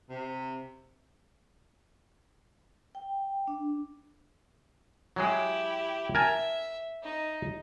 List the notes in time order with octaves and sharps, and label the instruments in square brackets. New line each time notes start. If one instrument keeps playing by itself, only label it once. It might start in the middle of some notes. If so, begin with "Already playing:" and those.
[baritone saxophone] C3
[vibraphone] G5
D4
[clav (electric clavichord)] F#3 G#3 G#4 [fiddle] E4 G4
[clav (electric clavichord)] A#4 G#5 A5 [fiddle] E5
[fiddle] D#4